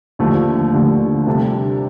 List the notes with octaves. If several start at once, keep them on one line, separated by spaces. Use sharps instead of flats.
D#2 D3 F3 A3
D#2 D3 F3 A3
C3 G3 D4 A4